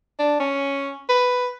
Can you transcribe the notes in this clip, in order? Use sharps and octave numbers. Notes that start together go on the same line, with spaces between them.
D4
C#4
B4